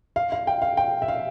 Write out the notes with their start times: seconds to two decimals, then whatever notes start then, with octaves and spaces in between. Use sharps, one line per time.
0.16 F5
0.32 F5
0.47 G5
0.62 F5
0.77 G5
1.02 E5
1.08 F5